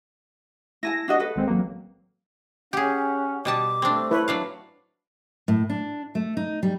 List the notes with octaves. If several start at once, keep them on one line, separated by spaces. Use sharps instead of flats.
E4 G#5 A5 A#6
D4 F#4 D#5
A4 B4
G#1 G#3 C4
A1 F#3 A#3
C#4 G4 G#4 F#5
B2 G3 A5 D6
A3 C4 D4
E4 B4 C#5
F#3 D4 F5
A2
D4
A3
D#4
G3